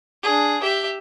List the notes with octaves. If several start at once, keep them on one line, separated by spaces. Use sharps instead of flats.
D4 G#4
G4 E5